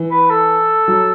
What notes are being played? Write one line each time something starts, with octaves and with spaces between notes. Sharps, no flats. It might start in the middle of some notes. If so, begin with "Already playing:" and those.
Already playing: E3
B4
A4
F#3